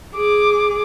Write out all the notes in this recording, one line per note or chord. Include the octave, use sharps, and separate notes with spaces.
G#4 D6